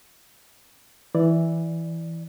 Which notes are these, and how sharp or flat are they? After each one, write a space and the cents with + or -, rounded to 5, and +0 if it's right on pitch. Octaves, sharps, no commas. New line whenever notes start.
E3 +0 D5 +0